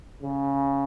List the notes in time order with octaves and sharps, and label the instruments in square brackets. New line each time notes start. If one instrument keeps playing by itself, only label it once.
[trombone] C#3